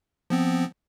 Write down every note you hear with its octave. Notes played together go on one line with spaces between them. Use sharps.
F3 B3 C4